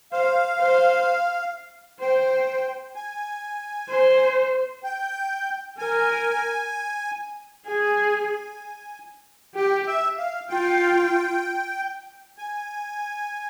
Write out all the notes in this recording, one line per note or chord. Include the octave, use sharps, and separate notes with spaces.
C5 F5
C5
C5 G5
G#5
C5
G5
A#4 G#5
G#4 G#5
G4 G5
E5
F5
F4 G5
G#5